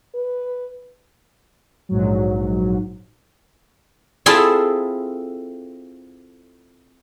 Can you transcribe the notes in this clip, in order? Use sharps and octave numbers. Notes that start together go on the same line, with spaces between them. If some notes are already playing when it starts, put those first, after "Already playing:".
B4
A#1 G#2 F#3
C4 E4 F4 G#4 A4